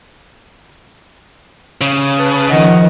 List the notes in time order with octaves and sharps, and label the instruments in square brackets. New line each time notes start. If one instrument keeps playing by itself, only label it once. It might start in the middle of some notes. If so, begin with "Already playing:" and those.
[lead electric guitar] C#3
[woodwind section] B4 A5
[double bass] D#3 F3 [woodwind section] D#5 F#5